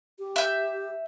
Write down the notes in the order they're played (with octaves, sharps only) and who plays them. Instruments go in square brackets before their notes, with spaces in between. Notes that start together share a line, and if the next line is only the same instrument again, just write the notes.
[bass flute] G4
[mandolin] E5 G6